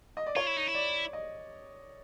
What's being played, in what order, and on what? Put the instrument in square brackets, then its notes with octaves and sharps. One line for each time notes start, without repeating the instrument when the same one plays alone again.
[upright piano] D#5
D5
[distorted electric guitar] F4 [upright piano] C#5
[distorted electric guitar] E4
D#4
E4
[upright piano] D5
D#5